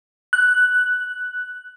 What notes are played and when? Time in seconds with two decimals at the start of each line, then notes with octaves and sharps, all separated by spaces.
0.33 F#6